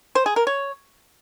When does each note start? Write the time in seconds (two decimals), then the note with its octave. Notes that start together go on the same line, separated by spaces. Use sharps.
0.15 C5
0.26 G#4
0.36 A#4
0.47 C#5